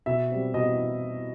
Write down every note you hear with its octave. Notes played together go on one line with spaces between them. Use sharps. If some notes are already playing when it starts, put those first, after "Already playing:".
B2 E5
G3 C4
B2 D#5